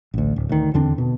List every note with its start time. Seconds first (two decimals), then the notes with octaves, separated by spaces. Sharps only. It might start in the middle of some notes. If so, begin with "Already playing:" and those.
0.14 A1 D2
0.36 D1
0.49 D2 D#3
0.74 E2 D3 C4 D4
0.98 B2